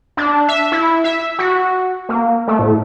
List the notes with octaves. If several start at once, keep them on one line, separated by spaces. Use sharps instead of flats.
D4
E5
E4
E5
F#4
A#3
A3
A2